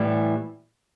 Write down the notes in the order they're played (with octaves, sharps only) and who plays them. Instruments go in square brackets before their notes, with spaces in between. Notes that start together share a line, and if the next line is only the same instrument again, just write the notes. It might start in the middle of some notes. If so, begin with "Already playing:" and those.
Already playing: [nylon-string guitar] A2 E3 G3